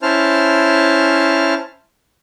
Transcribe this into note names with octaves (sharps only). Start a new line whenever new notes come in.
C#4 E4 C5 A5 F6